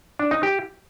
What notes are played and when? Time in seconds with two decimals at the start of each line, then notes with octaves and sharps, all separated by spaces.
0.19 D4
0.31 D#4
0.43 G4